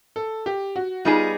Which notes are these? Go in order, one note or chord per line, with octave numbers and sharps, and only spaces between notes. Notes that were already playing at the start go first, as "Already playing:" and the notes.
A4
G4
F#4
G3 B3 D#4 F4 G#4